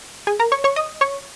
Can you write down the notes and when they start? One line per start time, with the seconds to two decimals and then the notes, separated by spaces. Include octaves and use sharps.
0.27 G#4 G#5
0.39 A#4 A#5
0.52 C#5 C#6
0.64 C#5 C#6
0.76 D#5 D#6
1.01 C#5 C#6